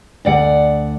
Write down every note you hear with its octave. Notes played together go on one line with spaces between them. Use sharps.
D2 D5 F#5